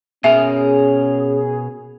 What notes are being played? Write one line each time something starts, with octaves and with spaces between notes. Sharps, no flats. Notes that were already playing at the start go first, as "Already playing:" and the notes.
B2 C#4 G#4 A#4 E5